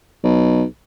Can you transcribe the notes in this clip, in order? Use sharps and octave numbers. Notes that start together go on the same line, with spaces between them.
B1